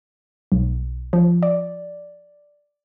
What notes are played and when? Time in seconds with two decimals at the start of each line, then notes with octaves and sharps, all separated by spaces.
0.52 B1
1.13 F3
1.43 D5